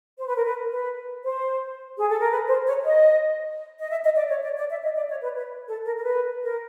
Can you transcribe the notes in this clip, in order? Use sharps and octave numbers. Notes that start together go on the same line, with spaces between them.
C5
B4
A#4
B4
B4
C5
G#4
A4
A#4
B4
C5
C#5
D#5
D#5
E5
D#5
D5
C#5
D5
D5
E5
D#5
D5
C#5
B4
B4
A4
A#4
A#4
B4
A#4